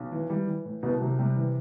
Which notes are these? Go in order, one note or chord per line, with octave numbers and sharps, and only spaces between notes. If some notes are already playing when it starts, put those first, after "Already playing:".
Already playing: B1
E3
E3 G3
E3
A2
C2 B2 B3
C3 F#3
C3 G3
E3